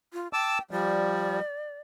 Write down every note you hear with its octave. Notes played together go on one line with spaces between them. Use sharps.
F4
G5 A5 D6 E6
F3 G3 D5